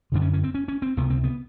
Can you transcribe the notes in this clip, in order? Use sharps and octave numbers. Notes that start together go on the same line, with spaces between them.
F#2 D3 D4
C#4
C#4
C4
C#4
C#4
C4
C#2 C3 B3
C4
B3